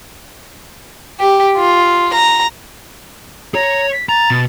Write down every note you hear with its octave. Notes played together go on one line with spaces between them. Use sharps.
G4
F4
A#5
C#5 A#5
B6
A#5 A6
B2